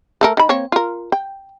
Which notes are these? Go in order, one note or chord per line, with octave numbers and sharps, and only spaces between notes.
A3 A4 A#4
D#3 B5
A#3 C4 C#5
F4 A#4
G5